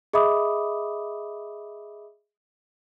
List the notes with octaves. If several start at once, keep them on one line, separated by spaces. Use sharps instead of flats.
G#4 D#5 E5 B5 D6 D#6